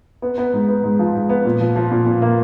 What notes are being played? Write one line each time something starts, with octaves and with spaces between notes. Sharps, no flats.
B3
B3
G#2
B3
G#2
F3
G#2
B3
A#2
F3
F3
A#2
A#2
A#3